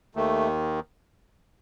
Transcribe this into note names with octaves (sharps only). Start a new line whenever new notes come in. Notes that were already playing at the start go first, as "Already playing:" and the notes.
D#2 D#3 A3